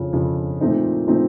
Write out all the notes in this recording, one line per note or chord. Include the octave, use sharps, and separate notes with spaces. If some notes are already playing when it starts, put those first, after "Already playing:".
Already playing: F2 C#3 F3
F2 C#3 F3
A#2 F3 A3 C4 D#4
A#2 F3 A3 C4 D#4